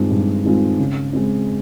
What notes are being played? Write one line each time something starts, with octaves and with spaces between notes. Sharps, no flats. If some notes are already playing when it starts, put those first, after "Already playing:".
Already playing: G2 D#3 G#3 C4 F4
G2
D#3 G#3 C4 F4
C#3
G#3 C4